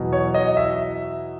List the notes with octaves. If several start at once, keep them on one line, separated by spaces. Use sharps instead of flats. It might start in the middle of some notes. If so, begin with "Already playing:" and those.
Already playing: E2 B2 F#3
C#5
D#5
E5